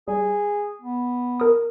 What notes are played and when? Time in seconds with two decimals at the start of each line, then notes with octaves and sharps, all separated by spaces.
0.08 G3 G#4
0.81 B3
1.40 A#4 D#6